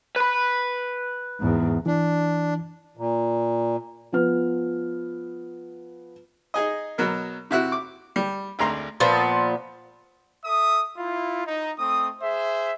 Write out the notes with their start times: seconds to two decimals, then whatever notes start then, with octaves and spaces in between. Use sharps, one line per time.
0.16 B4 B5
1.40 E2 G#2
1.86 E3 D4
2.97 A#2
4.12 F3 B3 F6
6.54 D#4 G#4 D#5
6.98 B2 F#3 A#4
7.51 C3 E4 F#4
7.72 D6
8.16 G3
8.59 G#1 D2 A#5 C6
9.00 A#2 F3 B3
10.45 A4 E5 D#6
10.97 E4 F4
11.47 D#4
11.79 A3 C4 D#6
12.22 G#4 C5 E5